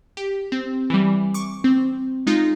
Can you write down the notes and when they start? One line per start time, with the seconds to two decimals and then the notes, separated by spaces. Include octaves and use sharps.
0.17 G4
0.52 C4
0.90 E3 G3
1.34 C#6 D6
1.64 C4
2.27 G#3 D#4 F4